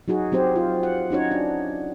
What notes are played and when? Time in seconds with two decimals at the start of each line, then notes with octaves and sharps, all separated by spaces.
0.08 F#3 D#4 F#4 G#4
0.32 F#3 C4 G4 C5
0.56 F4
0.83 F#5
1.10 C#4 D#4 F#4 C#5
1.31 D4